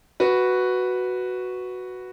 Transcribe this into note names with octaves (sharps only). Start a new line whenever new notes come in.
F#4 B4